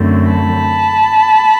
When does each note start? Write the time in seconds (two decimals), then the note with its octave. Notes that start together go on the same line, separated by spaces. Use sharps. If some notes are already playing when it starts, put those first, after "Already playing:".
Already playing: F#2 D3 F#3 A3 C4
0.31 A5 B5